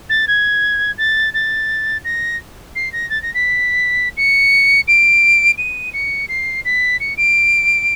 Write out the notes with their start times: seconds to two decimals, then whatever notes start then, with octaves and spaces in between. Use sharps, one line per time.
0.09 A6
0.27 G#6
0.98 A6
1.34 A6
2.04 A#6
2.75 C7
2.93 A#6
3.10 A6
3.22 A#6
3.34 B6
4.17 C#7
4.88 D7
5.58 D#7
5.93 C#7
6.29 C7
6.65 B6
7.00 C#7
7.17 D7